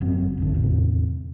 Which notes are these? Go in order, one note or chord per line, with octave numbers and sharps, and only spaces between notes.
F#1 F#2 C4
G#1 F2 D3
E2 A2 C3